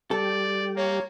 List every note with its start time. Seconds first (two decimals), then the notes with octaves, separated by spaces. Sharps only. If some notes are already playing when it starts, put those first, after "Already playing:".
0.11 G3 G4 A4 D5
0.76 A#3 C#5